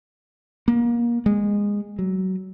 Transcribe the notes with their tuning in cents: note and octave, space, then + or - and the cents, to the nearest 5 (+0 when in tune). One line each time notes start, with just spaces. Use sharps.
A#3 +25
G#3 -20
F#3 +20